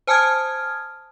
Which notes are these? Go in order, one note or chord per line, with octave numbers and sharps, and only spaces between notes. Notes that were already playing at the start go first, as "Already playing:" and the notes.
C5 G#5 A5 D#6 F6 G#6